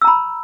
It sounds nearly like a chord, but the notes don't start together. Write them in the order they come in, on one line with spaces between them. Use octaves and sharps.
E6 A#5 B5